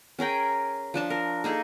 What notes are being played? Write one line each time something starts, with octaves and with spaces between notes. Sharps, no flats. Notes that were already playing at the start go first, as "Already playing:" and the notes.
C#4 G#4 A#4 G5
F3 D4 A5
A#4
A#3 D#4 G#4 A4